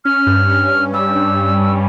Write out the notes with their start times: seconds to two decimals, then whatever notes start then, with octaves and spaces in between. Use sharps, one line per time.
0.05 C#4 F6
0.27 G2
0.49 C#4
0.71 G2
0.94 G3 E6
1.16 G2
1.38 G2
1.61 G2